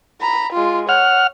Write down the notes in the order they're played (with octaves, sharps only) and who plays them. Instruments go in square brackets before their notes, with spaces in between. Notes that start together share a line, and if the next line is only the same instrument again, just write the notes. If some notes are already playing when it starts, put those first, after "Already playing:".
[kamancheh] A#5 B5
G#3 F4
[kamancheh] C#5 [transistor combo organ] F#5 F6